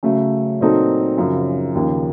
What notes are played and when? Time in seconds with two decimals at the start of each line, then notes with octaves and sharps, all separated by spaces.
0.03 C#3 F#3 A3
0.60 A#2 F#3 C4 D#4 A4
1.17 F#2 C#3 F3
1.75 D#2 C#3 F3